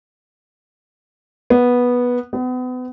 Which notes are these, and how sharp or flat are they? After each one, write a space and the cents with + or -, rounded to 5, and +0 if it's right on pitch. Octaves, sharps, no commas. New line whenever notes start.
B3 -10
B3 +35